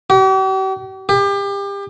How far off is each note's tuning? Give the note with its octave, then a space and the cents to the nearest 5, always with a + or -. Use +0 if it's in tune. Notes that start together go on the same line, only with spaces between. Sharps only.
G4 -45
G4 +30